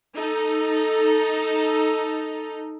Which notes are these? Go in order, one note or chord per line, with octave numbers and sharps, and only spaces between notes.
D#4 A4